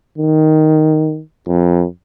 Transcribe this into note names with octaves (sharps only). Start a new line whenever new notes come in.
D#3
F2